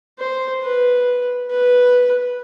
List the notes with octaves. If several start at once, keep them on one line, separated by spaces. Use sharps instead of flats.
C5
B4
B4